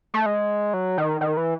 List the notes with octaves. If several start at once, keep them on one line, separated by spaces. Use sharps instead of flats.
A3
G#3
F#3
D#3
D#3
E3